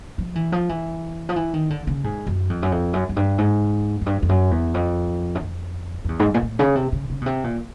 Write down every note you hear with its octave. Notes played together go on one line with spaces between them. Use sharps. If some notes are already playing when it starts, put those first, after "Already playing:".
F3
E3
F3
E3
F3
E3
D#3
D3
C#3
G#2
F#2
F2
F#2
F2
F#2
F#2
G2
G#2
F#2
G2
F2
F#2
E2
F2
F#2
F2
F2
E2
G#2
G2
A#2
A2
C#3
C3
C#3
C#3
B2
C3
A#2